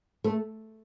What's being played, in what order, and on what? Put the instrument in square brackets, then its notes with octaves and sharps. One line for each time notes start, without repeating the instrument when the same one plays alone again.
[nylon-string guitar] A3